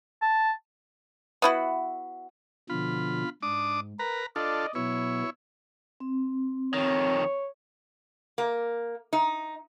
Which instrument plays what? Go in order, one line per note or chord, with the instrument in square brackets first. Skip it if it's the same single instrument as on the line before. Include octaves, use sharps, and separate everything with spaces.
[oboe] A5
[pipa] B3 E4 F#4
[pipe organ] B2 D3 F3 [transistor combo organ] F4 B5
[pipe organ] G#2 [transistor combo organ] D4 D6 D#6
[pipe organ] A#4 [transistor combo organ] B4 A#5
[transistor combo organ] D4 F4 A4 [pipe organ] D5 D#5
[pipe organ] B2 F#3 B3 [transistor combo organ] E4 C#5
[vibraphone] C4
[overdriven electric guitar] F2 D#3 [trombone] C#5
[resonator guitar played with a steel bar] A#3
D#4